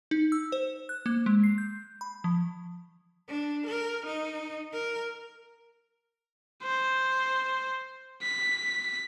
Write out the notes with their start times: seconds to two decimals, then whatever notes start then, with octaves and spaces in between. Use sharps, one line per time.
0.11 D#4
0.32 E6
0.52 C5
0.89 F#6
1.06 A#3
1.26 G#3
1.44 C7
1.58 G6
2.01 B5
2.24 F3
3.28 D4
3.66 A#4
4.06 D#4
4.72 A#4
6.63 C5
8.22 B6